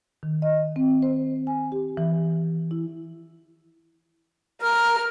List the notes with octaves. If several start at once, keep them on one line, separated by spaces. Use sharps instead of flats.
D#3
D#5
C4
C5
G#5
G4
E3
E4
A#4 F6